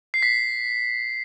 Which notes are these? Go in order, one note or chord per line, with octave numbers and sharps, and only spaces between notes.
C7
B6